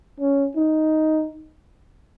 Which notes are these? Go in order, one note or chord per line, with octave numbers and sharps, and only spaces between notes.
C#4
D#4